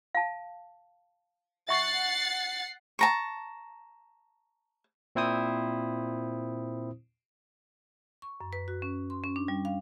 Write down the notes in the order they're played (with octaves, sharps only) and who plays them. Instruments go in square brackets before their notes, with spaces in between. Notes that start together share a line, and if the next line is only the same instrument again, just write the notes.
[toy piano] F5 A5
[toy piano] E5 C#6 [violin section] F#5 A6 C7
[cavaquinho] A5 A#5 C#6
[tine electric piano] A#2 C4 E4 C5 D#6
[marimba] C#6
F#2
B4
F#4
C#4
C6
C#4
D4
G3
F5